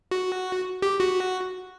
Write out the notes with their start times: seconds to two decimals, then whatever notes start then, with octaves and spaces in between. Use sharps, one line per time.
0.11 F#4
0.82 G4
1.00 F#4